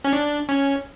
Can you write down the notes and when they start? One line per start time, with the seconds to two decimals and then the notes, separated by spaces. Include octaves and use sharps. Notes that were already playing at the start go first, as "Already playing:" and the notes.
0.04 C#4
0.13 D4
0.49 C#4